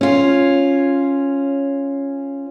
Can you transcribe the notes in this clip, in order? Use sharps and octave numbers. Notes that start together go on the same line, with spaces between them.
C#4 F4